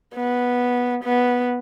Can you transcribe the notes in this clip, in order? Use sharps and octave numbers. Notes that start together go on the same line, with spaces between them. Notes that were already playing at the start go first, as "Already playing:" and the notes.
B3
B3